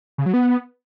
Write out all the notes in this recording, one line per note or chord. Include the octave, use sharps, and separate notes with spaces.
C#3
F#3
B3